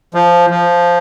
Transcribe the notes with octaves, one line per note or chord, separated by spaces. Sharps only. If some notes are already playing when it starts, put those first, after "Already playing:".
F3
F3